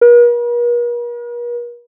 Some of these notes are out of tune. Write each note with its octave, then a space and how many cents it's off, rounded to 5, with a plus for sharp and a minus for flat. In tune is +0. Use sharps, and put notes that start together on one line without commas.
A#4 +45